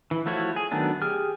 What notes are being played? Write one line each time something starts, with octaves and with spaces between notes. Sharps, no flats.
E3
F3 A3 E4 F#4 C#5
G#4
D#3 F#3 A3 B3 D4
G4 G#4 F6